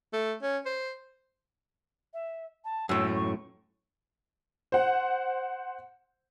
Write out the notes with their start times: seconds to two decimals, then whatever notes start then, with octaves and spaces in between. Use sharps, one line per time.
0.13 A3
0.42 C#4
0.66 C5
2.14 E5
2.65 A5
2.89 F#2 A2 E6
3.16 C#6
4.72 C5 F#5